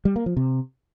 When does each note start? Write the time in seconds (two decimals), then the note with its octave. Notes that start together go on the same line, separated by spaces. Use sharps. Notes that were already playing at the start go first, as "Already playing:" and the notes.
0.05 G3
0.16 A#3
0.26 F3
0.37 C3